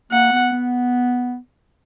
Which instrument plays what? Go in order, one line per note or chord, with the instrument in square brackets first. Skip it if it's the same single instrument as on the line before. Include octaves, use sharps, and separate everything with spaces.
[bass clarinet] A#3 [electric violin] F#5
[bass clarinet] B3
B3